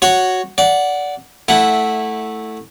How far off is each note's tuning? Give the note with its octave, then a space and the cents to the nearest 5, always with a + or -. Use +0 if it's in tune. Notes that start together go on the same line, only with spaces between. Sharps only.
F#4 +0 C#5 +0
D5 -20 F#5 +0
A3 +0 E4 -10 F#5 +0